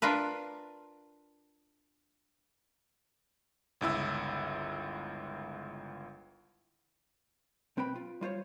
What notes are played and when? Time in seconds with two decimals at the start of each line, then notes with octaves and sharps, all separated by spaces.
0.02 D4 F4 A#4 B4
3.81 G1 C#2 E4 E6
7.77 B1 C4 B4 G5 B5
7.96 F4
8.21 G3 F4 C5 C#5